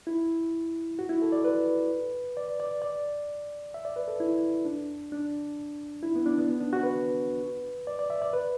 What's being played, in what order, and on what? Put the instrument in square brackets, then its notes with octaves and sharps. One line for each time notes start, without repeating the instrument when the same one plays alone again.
[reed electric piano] E4
F#4
E4
A4
D5
B4
D5
D5
D5
E5
D5
B4
A4
E4
D4
D4
E4
B3
D4
B3
B3
D4
F#4
B4
D5
D5
E5
D5
B4